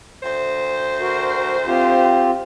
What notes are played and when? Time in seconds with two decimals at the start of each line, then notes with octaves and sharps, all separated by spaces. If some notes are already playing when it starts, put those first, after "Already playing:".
0.23 D2 C5
1.01 F#4 A#4
1.67 C4 F4 G4